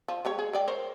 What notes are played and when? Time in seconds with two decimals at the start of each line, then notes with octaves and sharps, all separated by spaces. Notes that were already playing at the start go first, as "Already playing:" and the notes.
0.08 F3
0.25 G#3 G4 C#5
0.39 G#4
0.53 G#3 D5 G5
0.68 A#4 C5 C#5